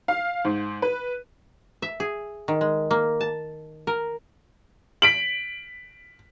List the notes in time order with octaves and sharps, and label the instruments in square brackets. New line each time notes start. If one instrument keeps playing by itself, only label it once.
[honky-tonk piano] F5
G#2
B4
[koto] E5
G#4
D#3
G#3
A#3
A5
A#4
[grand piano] B6 D7 F#7